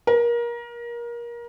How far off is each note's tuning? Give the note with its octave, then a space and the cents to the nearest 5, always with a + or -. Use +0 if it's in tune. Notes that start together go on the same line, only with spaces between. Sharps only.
A#4 +25